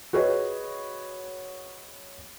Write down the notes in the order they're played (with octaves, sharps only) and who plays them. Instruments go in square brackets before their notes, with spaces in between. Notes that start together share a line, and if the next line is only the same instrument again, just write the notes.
[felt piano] F#4 G#4 B4 C#5 D#5